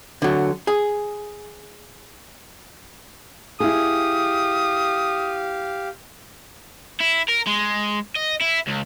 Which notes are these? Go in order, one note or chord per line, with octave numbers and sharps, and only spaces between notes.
D3 F#3
G#4
E4 G4 G#4 F5 D#6
E4
A#4
G#3
D#5
E4
C#2